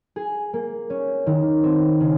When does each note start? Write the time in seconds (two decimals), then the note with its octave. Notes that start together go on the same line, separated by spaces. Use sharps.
0.16 G#4
0.53 A#3
0.90 C#4
1.26 D#3
1.63 C4
2.00 C#3